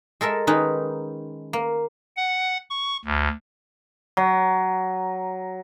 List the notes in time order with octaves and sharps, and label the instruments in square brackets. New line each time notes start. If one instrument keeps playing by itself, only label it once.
[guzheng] G#3 A4 A#4 E5
D#3 G#3 C#4 D#4 B4
A#3
[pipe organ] F#5
C#6
D2
[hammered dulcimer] F#3